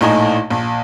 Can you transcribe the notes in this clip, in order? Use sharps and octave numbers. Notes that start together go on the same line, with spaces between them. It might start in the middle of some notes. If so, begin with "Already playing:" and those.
A#1 A2 D#4 G#5
A#1